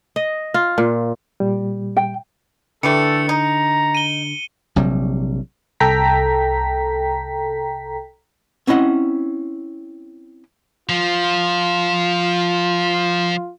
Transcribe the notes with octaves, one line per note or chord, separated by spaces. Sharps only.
D#5
F4
A#2
A#2 G3
G5
D3 E3 G3 A3 A4 C#7
D#4 A#5
D#7 G7
A#1 C3 F#3 G3
C2 A4 G5 A#5 B6
C4 C#4 E4 D#5 F#5
F3 F4